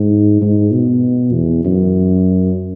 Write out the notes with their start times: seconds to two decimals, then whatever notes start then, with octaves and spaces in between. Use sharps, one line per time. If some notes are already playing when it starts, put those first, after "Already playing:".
Already playing: G#2
0.41 G#2
0.72 B2
1.33 E2
1.64 F#2